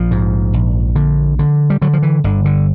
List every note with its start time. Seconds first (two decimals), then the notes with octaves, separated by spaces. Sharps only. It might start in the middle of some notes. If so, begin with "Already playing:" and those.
Already playing: A#1 F3
0.11 G#2
0.53 A#1
0.96 D3
1.39 D3
1.70 G3
1.82 D3 F#3
1.93 F3
2.03 E3
2.24 G1 D3
2.45 D3